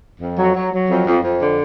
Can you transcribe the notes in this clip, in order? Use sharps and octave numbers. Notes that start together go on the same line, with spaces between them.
F2
F#3
F#3
F#3
F2
F2
F2
D3